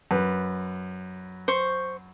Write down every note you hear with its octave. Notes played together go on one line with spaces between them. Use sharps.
F#2 B4
C5 C#6